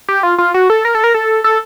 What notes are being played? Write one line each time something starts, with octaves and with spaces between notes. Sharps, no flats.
G4
F4
F4
F#4
A4
A#4
A4
A#4
A4
A4